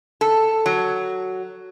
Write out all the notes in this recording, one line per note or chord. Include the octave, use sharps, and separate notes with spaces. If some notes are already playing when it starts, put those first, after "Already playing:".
A4
F#3